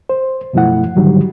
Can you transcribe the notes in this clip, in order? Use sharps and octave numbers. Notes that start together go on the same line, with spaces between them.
C5
F#2 B2 F3 A3 E4 F#5
G#2 D3 D#3 F#3 G3